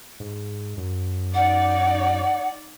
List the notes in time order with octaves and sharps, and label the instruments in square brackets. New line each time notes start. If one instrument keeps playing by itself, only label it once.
[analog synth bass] G#2
F#2
[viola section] D#4 D5 [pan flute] F#5